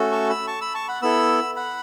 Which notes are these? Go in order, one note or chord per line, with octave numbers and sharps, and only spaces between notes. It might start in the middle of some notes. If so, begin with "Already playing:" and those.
Already playing: A3 C#4 F#4 A4
A5 C#6
B5 E6
A5 C#6
B5 E6
A5 C#6
F#5 B5
B3 E4 A4 B5 E6
F#5 B5